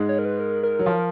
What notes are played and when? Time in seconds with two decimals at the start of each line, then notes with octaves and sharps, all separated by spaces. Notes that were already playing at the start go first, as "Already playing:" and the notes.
Already playing: G#2 G#3
0.09 C#5
0.19 A#4
0.25 B4
0.39 A#4
0.63 A#4
0.79 F#3
0.86 F3